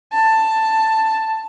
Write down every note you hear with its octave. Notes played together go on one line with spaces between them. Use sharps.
A5